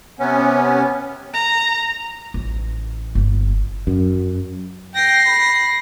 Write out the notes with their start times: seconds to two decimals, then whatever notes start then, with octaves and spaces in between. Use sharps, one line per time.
0.19 C3 B3 C#4
1.33 A#5
2.34 A1
3.15 G1
3.87 F#2
4.96 G5 A#6 C7
5.28 B5